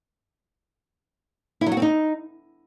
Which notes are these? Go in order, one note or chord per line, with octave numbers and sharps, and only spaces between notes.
E4
F#3
F#4
C4
D#4